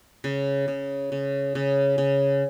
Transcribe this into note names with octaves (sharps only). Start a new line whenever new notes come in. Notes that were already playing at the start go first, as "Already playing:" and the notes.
C#3
C#3
C#3
C#3
C#3